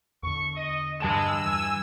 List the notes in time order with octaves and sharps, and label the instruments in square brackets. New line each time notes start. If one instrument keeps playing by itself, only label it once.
[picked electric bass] E2 D3 [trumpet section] C#6
[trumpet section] D#5
[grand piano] G2 A5 E7 [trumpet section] G#3 [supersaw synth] E6
[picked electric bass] E3 [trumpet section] G#5